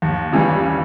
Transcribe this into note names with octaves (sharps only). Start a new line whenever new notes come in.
D#2
C#3 E3 G3